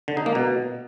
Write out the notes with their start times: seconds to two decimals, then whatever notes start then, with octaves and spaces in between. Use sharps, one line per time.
0.08 D3
0.17 D#4
0.26 A#3
0.35 B2